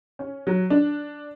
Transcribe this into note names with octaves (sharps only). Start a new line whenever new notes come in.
C#4
F#3
D4